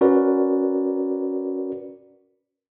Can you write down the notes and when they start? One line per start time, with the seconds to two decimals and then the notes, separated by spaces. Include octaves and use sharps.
0.01 C#4 F#4 A#4 B4 D5